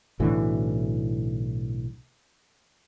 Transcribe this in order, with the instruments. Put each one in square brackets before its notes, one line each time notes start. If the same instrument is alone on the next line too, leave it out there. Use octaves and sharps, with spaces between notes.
[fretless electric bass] B1 A2 D3 E3